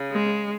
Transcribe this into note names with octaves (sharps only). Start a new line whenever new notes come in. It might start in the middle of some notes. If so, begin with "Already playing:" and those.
Already playing: C#3
G#3